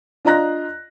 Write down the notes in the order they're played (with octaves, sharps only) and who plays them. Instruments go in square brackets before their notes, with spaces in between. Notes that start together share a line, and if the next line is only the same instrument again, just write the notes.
[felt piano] D4 F4 D#5 A#5 F#6 A#6